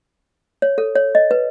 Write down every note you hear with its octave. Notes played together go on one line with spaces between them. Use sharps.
C#5
A4
C#5
D#5
B4